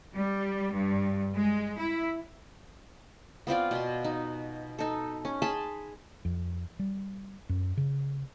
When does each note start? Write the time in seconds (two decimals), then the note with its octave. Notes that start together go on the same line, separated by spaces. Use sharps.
0.15 G3
0.73 G2
1.35 G#3
1.79 E4
3.47 B3 C4 F4 D5
3.71 B2 C6
4.04 D#4
4.79 D#4 A4
5.25 C#4
5.42 G#4 A5 B5 C6
6.25 F2
6.79 G3
7.49 F#2
7.77 C#3